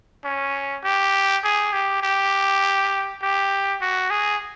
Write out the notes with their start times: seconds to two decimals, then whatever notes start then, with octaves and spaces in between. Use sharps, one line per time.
0.24 C#4
0.84 G4
1.44 G#4
1.73 G4
2.03 G4
3.22 G4
3.81 F#4
4.10 G#4